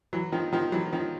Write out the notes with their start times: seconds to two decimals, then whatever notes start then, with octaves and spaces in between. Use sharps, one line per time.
0.13 E3 F#3
0.32 D#3 F3
0.53 D#3 F3
0.72 E3 F#3
0.92 D#3 F3